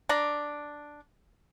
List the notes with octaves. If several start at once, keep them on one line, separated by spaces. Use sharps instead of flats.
D4 D5 A#5